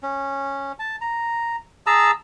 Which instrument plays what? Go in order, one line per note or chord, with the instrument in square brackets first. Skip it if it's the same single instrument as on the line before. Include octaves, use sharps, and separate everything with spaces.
[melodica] C#4
A5
A#5
G#4 A5 A#5 E6